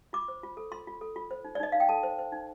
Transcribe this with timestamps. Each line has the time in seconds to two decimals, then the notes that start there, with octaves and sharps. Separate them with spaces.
0.13 F4 D6
0.28 C5
0.43 F4
0.57 A4
0.72 F4 C6
0.87 F4
1.01 A4
1.16 F4
1.31 C5
1.44 D#4
1.55 D5
1.60 D#4 D#5
1.72 D#4 F5
1.80 G5
1.89 A4 A5
2.03 C5
2.19 C5
2.32 D#4